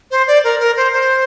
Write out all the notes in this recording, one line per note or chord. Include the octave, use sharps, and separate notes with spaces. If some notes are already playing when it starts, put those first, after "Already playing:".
C5
D5
A#4
A#4
C5
C5